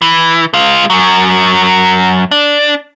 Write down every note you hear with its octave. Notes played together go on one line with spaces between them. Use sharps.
E3
G#3 F4
F#2 F#3
D4